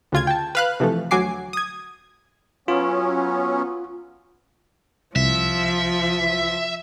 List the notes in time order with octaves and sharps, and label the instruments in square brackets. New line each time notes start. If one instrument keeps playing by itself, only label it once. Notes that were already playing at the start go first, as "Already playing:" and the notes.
[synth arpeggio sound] D2 C#3 F4 G#6
G5 A5
B4 F5 F#6
C3 E3 F3 A3
D2 F#3 G#5 D6 C7
D#6 G#6
[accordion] F#3 B3 C#4 [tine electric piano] F4
[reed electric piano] C2 [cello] F3 [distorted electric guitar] E5